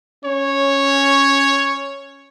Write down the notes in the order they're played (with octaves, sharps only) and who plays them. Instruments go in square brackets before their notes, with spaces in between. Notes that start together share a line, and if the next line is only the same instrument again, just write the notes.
[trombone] C#4 [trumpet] C#5